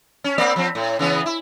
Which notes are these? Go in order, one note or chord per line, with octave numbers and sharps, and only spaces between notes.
C#4
A#3 C4 D5
F3 C4
A2
C#3 E3 B3
E4